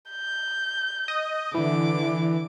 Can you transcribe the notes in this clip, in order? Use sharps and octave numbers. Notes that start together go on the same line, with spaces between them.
G6
D#5
D3 E3 D6